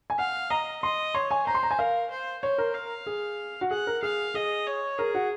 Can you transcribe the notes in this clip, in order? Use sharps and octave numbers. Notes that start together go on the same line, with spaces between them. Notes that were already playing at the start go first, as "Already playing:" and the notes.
G#5
F5 F#5
D#5 A#5
D#5 C6
C#5 C6
G#5
C5 A#5
C6
A#5
G#5
A#4 F5
C5
C5 C#5
A#4
F5
G#4
F#4
G#4 F#5
A#4
G#4 F5
G#4 D#5
C#5
G#4 A#4
F#4